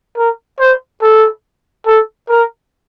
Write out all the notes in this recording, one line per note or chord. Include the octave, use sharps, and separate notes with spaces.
A#4
C5
A4
A4
A#4